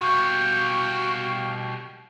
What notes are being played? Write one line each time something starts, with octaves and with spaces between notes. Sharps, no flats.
B2 G3 F#4 F5 G5 C#6